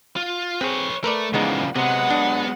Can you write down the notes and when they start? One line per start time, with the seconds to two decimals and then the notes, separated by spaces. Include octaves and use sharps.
0.16 F4
0.61 C4 G#4 B4 C#5
1.04 A3 A#4 B4 D5
1.34 C#3 E3 F3 G3 G#3 A#3 B3 D#4
1.76 C3 F#3 G#3 B3 F#5
2.10 D4